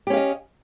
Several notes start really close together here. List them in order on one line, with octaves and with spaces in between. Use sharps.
G4 C#4 F5 D#5